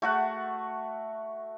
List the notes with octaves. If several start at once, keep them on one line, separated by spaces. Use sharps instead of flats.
A3 F#4 F#5